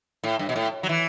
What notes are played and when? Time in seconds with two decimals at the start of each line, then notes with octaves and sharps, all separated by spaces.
0.24 A2
0.39 G2
0.49 B2
0.56 A2
0.83 F#3
0.89 E3